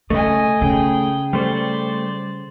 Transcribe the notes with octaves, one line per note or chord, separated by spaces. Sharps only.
C#3 A3 D#5 G#5
C#3 G#4 G5
G3 A3 C5 D5